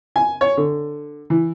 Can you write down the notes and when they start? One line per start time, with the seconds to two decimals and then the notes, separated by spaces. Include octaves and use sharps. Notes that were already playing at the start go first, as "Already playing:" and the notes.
0.16 G#5
0.41 C#5
0.57 D3
1.30 E3